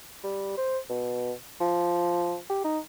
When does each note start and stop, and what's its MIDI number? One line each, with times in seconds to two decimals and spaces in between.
0.23 0.54 55
0.57 0.78 72
0.90 1.32 47
1.60 2.36 53
2.50 2.60 67
2.64 2.78 63